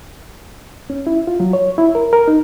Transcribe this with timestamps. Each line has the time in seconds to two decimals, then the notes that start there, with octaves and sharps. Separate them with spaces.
0.90 C#4
1.07 E4
1.27 F4
1.40 F#3
1.53 C#5
1.78 E4
1.95 A#4
2.13 A#4
2.28 D#4